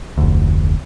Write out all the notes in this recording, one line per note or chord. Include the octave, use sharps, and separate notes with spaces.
F1 D2